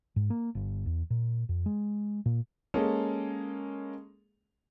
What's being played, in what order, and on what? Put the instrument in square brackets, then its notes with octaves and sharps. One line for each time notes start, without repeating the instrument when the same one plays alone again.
[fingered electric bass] G#2
A#3
G1
E2
A#2
F2
G#3
A#2
[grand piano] G#3 A#3 C#4 G#4 A4